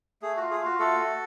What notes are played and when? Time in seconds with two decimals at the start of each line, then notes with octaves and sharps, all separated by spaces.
0.22 A3 G#4
0.36 F4 F#4
0.51 G#4
0.60 F4 F#4
0.79 A3 F#4 A4
0.99 A3